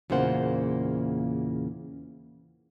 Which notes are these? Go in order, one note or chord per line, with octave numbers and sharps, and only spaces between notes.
E2 A#2 C#3 A#3 C5 F#5